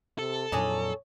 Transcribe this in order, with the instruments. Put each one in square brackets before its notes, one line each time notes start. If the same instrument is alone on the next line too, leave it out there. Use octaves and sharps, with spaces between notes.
[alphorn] C3 [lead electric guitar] A4
[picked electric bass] F2 A#2 F#3 [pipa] D4 D#4 G#4 [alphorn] C#5